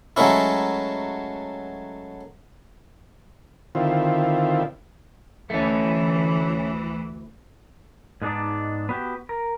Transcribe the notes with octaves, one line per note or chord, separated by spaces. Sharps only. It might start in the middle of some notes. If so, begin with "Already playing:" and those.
F#3 G#3 A3 C#4 E4
D3 D#3 C4 E4 F4
D2 E3 A3 C#4
G#2 G#3 B3 D4 D#4 D5
B3 F#4 G4
A#4